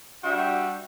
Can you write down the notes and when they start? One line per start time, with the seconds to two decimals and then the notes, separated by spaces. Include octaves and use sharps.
0.23 G3 D4 F#4 E5 G5